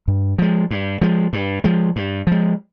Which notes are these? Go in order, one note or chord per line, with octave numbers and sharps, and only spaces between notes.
G2
F3 G#3
G2
F3 G#3
G2
F3 G#3
G2
F3 G#3